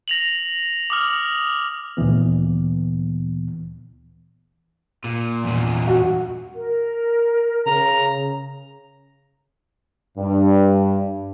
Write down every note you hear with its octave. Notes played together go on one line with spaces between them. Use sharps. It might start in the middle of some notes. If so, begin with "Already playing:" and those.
A#6 F7 F#7
D6 D#6 F6
D2 A#2 E3 B3
A#2
E2 A#2
F#4
A#4
C#3 A#5
G2